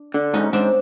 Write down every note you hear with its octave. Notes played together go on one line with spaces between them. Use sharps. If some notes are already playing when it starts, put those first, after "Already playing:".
Already playing: D4
D3
G#2 C#4 D#4
G#2 C4 D4